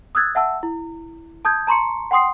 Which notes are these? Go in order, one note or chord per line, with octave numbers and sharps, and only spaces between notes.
D#6 E6 F#6 G#6 A6
E5 F#5 A5 E6
E4
A5 D#6 G6 G#6
A5 A#5 C6 C#6 C#7
F#5 G5 C6 D#6 C7